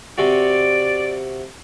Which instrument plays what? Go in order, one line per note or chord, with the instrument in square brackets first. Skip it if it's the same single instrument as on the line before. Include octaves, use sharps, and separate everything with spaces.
[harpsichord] C3 F#4 [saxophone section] D5